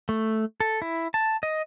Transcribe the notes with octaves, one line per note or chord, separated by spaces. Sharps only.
A3
A4
E4
A5
D#5